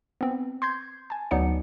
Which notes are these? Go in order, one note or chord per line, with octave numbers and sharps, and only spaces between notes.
B3 C4
C6 G6 G#6
G#5 A5
D2 F#3 B3 D#4 D5 C#7